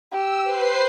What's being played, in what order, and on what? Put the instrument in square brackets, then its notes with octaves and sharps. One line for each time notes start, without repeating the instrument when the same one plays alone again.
[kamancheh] G4 [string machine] E6
[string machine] B4 C5 C7